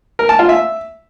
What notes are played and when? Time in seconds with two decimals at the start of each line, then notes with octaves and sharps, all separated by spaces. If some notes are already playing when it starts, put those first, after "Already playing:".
0.19 A#4
0.29 A5
0.39 F4
0.49 E5